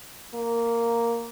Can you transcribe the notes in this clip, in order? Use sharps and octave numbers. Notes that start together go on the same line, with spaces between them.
A#3